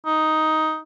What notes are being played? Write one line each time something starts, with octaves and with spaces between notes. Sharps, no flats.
D#4